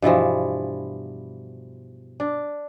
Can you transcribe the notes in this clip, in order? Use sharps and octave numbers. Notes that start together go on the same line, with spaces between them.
G2 B2 E3 F3
D4